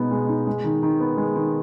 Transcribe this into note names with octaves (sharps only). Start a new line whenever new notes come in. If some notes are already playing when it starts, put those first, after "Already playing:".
Already playing: B2 G#3 B3 D#4
G#3
D#4
G#3
D#3
D#3
B3
G#3
D#3